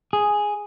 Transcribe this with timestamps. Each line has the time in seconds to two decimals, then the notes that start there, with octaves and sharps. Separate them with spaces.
0.13 G#4